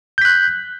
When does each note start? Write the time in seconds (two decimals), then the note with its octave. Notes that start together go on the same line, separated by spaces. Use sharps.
0.18 G6
0.21 B6
0.25 F#6